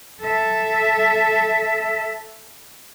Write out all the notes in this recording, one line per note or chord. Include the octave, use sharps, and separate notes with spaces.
A4 E5